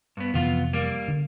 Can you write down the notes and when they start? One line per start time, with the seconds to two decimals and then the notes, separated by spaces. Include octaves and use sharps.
0.17 G2 B3
0.34 F2 C3 E3 B3 F4
0.73 G3 A#3
1.08 D3